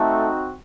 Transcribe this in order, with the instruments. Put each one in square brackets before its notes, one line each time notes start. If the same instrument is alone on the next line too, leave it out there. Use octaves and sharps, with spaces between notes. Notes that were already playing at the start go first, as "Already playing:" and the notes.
Already playing: [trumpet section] A3 C4 D#4 F#4 A4